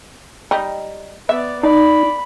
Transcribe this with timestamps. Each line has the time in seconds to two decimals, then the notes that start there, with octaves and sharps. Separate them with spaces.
0.51 G3 D#4
1.29 B3 D5 E5
1.63 D#4 D5 B5